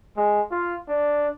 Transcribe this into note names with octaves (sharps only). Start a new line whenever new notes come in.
G#3
F4
D4